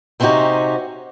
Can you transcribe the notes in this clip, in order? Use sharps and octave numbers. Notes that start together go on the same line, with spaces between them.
C3 C4 C#4 D#4 F#4 G4